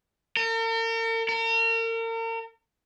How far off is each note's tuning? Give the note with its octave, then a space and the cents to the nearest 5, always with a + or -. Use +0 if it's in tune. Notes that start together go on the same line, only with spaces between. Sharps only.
A#4 -45
A#4 -40